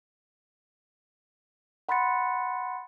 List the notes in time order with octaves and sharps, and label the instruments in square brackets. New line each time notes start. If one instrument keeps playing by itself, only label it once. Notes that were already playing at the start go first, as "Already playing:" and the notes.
[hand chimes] F#5 B5 C6 F#6 A6 C#7